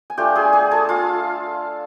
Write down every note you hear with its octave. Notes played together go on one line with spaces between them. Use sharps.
G#5
A3 D4 F4 G4 G5
G#4 G#5
G#4 G#5
A4 A5
F4 F5